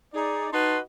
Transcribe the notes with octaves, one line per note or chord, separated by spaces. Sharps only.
D#4 G#4 D5
D#4 F#4 B4 D#5 A5 C6